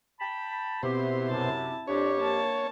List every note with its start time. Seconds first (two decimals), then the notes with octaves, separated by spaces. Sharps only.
0.20 G5 A5 B5
0.83 B2 C4 E4 G4 C5
1.30 F#2 C3 E4 A5
1.87 F2 D4 G4 C#5
2.20 A#3 A5